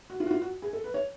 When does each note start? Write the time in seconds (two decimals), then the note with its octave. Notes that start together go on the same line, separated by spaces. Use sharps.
0.10 F#4
0.20 F4
0.26 F#4
0.31 F4
0.42 F#4
0.62 G#4
0.73 A4
0.84 B4
0.94 C#5